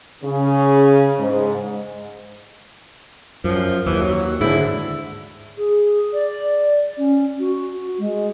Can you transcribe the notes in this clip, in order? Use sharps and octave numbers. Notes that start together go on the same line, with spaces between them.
C#3
G#2
F#2 F3
D#2 E3
F#3
G#2 D3 E4
G#4
D5
C#4
F#4
G#3